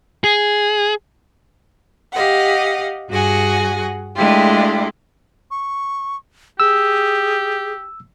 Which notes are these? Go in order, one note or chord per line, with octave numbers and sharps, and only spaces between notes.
G#4
G4 D#5 F5 F#5
G2 F#4 G#4 F#5 G#5 A#6
G#3 A3 D4 E4 F4 G4
C#6
G4 G#4 E6